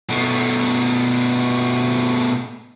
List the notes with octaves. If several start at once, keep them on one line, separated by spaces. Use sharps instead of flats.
B2 A3